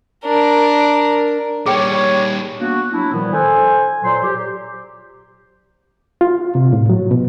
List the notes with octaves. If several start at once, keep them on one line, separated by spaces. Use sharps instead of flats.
D4 A#4
A#2 G3 G#4 C#5 G5
A#3 B3 D4 F#4
F#3 D4 E4
A#2 D#3 F3 G3 B3
A4 C5 G#5
A#2 F#3 C5 C6
G4
F4
C3
A2
F#3
B2